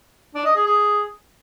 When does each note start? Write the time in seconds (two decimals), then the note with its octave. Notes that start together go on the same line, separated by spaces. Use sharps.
0.35 D4
0.45 D#5
0.56 G#4
0.66 G#4